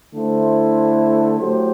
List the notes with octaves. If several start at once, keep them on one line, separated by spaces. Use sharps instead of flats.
D3 A3 E4 A4 C5
F#3 A3 E4 G4 C5